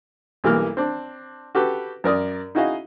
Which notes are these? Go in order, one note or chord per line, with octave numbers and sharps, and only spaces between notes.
B1 E3 G3 A#3 F6
C4 D4
F#4 G4 A4 B4
F#2 A#4 D5 D#6
D#4 E4 F#4 G#4 D#5 F5